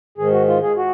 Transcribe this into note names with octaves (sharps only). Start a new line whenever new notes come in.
G#2 D#3 G#4
F#4
F4
G#4
F#4